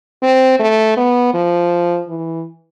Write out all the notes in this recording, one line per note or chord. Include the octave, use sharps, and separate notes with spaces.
C4
A3
B3
F3
E3